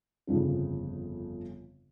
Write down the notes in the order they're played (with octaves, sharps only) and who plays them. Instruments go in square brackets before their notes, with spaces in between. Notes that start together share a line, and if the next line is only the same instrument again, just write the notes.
[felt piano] G1 F2 C#3 F3 C4